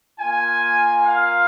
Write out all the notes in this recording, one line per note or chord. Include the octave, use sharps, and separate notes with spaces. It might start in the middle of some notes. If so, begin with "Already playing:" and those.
A#3 F4 G#5
F5